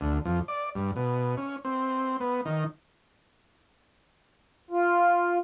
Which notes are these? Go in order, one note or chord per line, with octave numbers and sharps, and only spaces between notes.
D2
F2
D5
G2
B2
C#4
C4
B3
D#3
F4